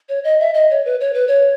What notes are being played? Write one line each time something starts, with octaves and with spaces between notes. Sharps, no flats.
C#5
D#5
E5
D#5
C#5
B4
C#5
B4
C#5